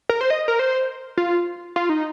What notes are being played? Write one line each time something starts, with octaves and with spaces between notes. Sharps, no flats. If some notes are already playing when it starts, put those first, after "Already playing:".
A#4
C5
D#5
A#4
C5
F4
F4
D#4